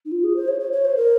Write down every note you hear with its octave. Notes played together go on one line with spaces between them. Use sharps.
D#4
F4
G#4
C5
C#5
C#5
C#5
C5
A#4